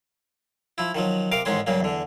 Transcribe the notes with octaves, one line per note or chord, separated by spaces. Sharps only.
F3 E4
D#3 F3 F#3
C3 A#4 F5 D6
A1 G#2 D#3 G#3 C#4 C6
G2 C#3 F#3 A#3
E2 D3